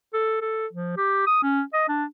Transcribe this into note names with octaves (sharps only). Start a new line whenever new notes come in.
A4
A4
F3
G4
D#6
C#4
D#5
D4